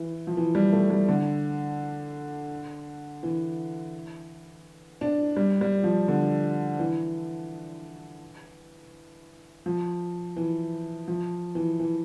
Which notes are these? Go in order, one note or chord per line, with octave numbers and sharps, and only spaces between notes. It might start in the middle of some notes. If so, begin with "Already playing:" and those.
Already playing: E3
F3
E3
G3
A3
G3
D3
E3
D4
G3
G3
F3
D3
E3
F3
E3
F3
E3
E3